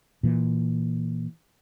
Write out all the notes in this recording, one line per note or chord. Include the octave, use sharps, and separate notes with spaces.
A#2 E3